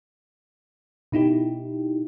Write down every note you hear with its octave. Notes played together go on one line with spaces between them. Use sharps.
B2 D#4 E4 G4